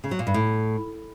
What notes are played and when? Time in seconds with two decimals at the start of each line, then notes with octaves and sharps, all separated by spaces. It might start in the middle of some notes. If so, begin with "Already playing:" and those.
0.04 C#3
0.11 F#3
0.19 A#2
0.27 G2
0.34 A2